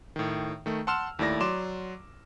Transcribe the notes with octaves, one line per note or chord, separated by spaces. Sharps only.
A2 D#3
D#3 A3
F#5 A5 C6 E6 F6 E7
D#2 A3 E4 D5 A#6
F#3 D5 C6 D6 E7